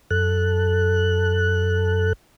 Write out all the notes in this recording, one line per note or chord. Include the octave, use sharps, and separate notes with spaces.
F#2 A4 F#6